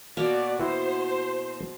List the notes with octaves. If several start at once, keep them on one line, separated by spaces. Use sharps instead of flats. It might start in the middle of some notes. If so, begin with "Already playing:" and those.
B2 A#3 F#4 C#5 D5
E4 F#4 B4 C5